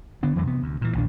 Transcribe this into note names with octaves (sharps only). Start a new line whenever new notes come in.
D3 B3 D4
F2 E3 F#3 A3
C3 B3
D2
A#2 E3
A#1 D#2 D4